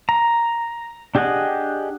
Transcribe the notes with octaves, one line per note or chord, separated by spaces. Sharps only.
A#5
D4 G4 G#4 D#5 F#5